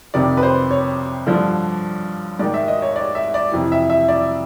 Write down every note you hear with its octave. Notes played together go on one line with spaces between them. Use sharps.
F2 C3 D#3 D5
B4
C5
C#5
G2 D3 F3
G#2 D#3 D5
E5
D#5
C#5
D5
E5
D5
F2 C3 E3
E5
E5
D5